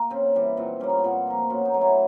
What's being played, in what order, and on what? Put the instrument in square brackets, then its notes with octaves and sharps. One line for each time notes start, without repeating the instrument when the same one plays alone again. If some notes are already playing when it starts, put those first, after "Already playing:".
Already playing: [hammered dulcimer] A#3
C#3 C4
E3 G3
A#2 C4
G3 A#3 C#4
C4
B3
A#2 C4
F3 A#3
B2 C#4
D#4
F#3 A3
E4